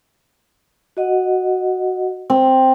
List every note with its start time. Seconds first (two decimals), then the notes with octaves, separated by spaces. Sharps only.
0.97 F#4 D#5 F#5
2.30 C4